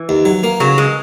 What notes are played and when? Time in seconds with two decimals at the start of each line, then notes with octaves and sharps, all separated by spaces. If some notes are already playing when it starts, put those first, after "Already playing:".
Already playing: E3
0.09 D#2
0.25 F#3
0.44 A#3
0.60 C#3 F#3
0.78 G#3